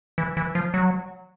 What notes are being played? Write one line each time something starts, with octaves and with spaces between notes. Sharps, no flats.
E3
E3
F3
F#3